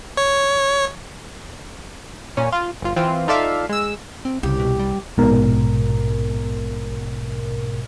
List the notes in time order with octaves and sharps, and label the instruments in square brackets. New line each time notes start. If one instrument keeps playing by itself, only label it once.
[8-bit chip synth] C#5
[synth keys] A#2 C#4
F4
G1 F4
E3 C4 F4
D#4 F4 A4 D5 E5 F5
G#3 E6
[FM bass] C4
[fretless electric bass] C2 [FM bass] C#3 [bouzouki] G4
[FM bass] B2
G3
[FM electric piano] A#1 G#2 B2 A#4